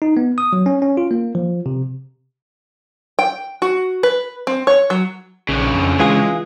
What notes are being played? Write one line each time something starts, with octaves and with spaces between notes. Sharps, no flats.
D#4
B3
D#6
F#3
C#4
C#4
F4
A#3
F3
C3
G5
F#4
B4
C4
C#5
F#3
A#1 C#3 D4
F2
E3 G#3 F4 G#4